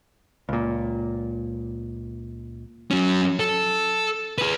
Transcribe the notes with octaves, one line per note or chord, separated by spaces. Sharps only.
C#2 A#2
F#3 C#4
A4
G#4 B4